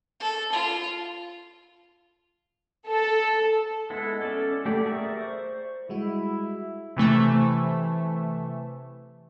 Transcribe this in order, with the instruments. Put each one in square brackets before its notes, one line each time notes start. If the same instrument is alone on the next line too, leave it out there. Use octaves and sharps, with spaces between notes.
[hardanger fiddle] A4
F4
[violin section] A4
[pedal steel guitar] G#3 B3 E4 A4
C#4 A4 C#5 D5 A5
A3 B3 G4 D5
G#4 A#4 D5 E5 C#6
C5 C#6
[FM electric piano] G3 G#3 F#4 [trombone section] E4
[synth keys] C3 E3 A3 E5